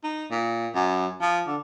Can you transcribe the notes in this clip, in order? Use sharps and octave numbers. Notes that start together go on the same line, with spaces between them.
D#4
A#2
F#2
F3
D3